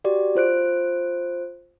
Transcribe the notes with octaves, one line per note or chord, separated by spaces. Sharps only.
F#4 G4 D5
F4 C5 F#6 D7